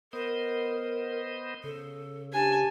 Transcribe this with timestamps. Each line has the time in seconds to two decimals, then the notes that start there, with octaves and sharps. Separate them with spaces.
0.13 B3 A#4 C5 D#5
1.64 C#3 A4
2.33 D4 G4 G#5 A5